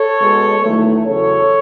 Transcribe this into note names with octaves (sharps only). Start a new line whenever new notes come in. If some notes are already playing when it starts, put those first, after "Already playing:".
Already playing: A4 C#5
B2 G#3 B3
E2 D#3 F#3 A3
E2 C#3 F#3 A4 C#5